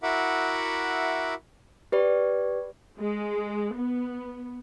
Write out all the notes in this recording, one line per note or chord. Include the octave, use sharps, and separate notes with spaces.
E4 F#4 A#4 E5 F#5 D6
G4 B4 D5
G#3
B3